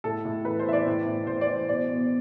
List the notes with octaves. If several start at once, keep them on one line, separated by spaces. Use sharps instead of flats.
A2 A4
A2
E3 B4
C5
E3 E5
D5
A2
A2
A2 C5
D5
E3
C5
B2 D5
B2